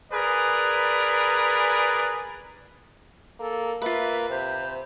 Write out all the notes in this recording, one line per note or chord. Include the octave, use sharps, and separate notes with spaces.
G#4 A#4 B4 D5
A#3 A4
A#3 F4 B4 E5
C3 C5